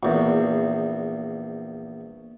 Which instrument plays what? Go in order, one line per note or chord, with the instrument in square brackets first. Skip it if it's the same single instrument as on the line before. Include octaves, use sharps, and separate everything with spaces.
[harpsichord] A#1 E2